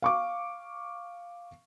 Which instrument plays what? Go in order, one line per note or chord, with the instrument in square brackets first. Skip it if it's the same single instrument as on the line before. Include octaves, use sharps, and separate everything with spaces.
[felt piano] F5 C#6 D6